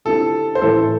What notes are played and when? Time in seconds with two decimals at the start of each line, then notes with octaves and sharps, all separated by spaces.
0.05 D3 C4 E4 G4 A4
0.55 C5
0.61 A2 E3 A3 A4